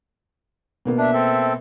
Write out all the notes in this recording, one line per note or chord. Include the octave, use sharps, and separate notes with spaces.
B2 A#3 B3
D4 E5
C4 A4